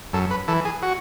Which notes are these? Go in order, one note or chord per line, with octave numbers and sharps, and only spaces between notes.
F#2 A4
B4
E3 A4
G#4
F#4